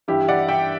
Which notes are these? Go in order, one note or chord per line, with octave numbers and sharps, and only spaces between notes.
G2 E3 G3 E4 G4
D5 F#5
E5 G5